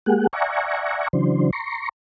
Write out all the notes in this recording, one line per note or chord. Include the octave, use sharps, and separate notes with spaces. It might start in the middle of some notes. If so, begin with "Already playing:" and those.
G#3 A#3 G4 G#4 F#5
D5 E5 F#5 G#5 A#5 C#6
C#3 E3 F#3 D4 C5
A#5 C6 C#6